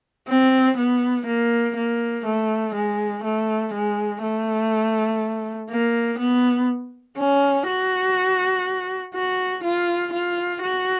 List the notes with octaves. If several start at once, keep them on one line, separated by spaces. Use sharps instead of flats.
C4
B3
A#3
A#3
A3
G#3
A3
G#3
A3
A#3
B3
C#4
F#4
F#4
F4
F4
F#4